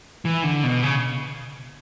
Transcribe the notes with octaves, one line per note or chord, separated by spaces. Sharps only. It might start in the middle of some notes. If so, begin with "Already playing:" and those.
E3
D3
B2
C#3